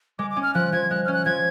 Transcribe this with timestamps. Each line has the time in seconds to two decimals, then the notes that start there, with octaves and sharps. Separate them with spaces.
0.19 G#3 D6
0.31 D6
0.36 C#4
0.43 F6
0.55 F3 F#6
0.72 F3 G#6
0.90 G#3 F#6
1.06 C#4 F6
1.13 F#6
1.25 F3 G#6